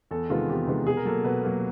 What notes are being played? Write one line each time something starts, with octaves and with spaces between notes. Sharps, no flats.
E2 A4
C3 D#3 G#3 B3 F4
E2 G4
C3 D#3 G#3 B3
B2 G#4
A#4
F#3 A#3 A4
B2 B4
F#3 A#3